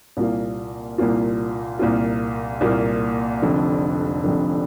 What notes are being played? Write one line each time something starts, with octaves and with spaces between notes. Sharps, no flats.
C2 A#2 A#3 F4
C2 A#2 A#3 F4
C2 A#2 A#3 F4
C2 A#2 A#3 F4
F1 F2 D3
F1 F2 D3